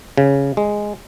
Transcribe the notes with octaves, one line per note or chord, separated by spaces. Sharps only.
C#3
G#3